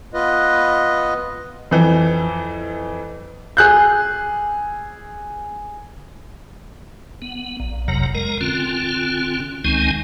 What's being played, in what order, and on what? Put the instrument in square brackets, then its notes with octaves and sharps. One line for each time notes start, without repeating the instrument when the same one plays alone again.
[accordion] B3 F4 B4 D#5
[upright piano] F2 E3
[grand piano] G#4 F#6 G6
[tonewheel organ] B3
A#1
F#1 F2 C3 F#3 A#5
G#3 A#4 A#5
D3 C4 C#4 F4
C#2 D#3 G#3 C4 D#4 G#5